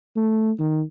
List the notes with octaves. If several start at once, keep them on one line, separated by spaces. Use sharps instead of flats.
A3
D#3